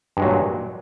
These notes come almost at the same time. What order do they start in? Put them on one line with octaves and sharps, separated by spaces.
G2 G#3 F#3 A#2